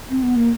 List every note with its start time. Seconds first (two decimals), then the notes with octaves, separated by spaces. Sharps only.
0.10 C4
0.22 B3
0.36 A#3